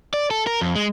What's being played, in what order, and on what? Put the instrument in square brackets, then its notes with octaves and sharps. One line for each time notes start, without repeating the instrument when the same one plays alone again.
[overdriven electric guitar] D5
A4
A#4
F2
G#3